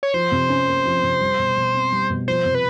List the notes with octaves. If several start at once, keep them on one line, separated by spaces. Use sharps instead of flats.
C#5
F3 C5
C3
C#4
A#3
F3
C3
G3
B2
B2
C4
G3
B2
F3 C5
C3
B4